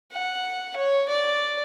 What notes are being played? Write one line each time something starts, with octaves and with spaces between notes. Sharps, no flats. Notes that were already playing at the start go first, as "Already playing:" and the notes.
F#5
C#5
D5